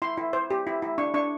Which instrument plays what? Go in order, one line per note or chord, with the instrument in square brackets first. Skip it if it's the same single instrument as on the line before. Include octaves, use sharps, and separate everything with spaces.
[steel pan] E4 C6
E4
C5
G4
E4
E4
D4 C#6
D4 C#6